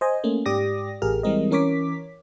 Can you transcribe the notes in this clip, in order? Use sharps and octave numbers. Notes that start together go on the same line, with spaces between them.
C5 D#5 G#5
A3 A#3 C#4
G#2 G4 D5 D6 D#6 A#6
A1 G4 G#4 A#4 F6
E3 G3 G#3 C4 A#4 D#5
E3 C#4 A#4 C#5 D6 B6